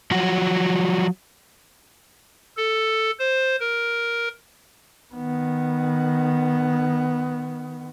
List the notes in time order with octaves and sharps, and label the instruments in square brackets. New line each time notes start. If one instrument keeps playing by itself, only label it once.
[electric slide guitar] F3 F#3 F#4
[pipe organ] A4
C5
A#4
[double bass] D#3 B3